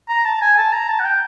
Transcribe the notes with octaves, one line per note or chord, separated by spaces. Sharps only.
A#5
A5
G#5
A5
A#5
A5
F#5
G5